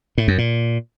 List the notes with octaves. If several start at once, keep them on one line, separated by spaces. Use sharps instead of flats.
A2
F#2
A#2